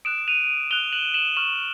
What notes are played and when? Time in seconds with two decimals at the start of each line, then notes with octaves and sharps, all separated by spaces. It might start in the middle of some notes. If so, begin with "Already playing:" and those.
0.05 D#6 F#6 D7 E7
0.28 D#7 F7
0.71 D#6 F#6 F7 G7
0.92 E7 F#7
1.14 E7 F#7
1.36 C#6 F6 E7 F#7